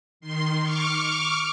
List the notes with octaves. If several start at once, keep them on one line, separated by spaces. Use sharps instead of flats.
D#3 C6
C#6 D6 F6